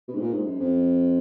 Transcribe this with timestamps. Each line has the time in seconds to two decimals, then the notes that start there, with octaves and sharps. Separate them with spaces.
0.08 B2
0.15 G#2
0.21 A#2
0.34 G#2
0.46 F#2
0.59 F2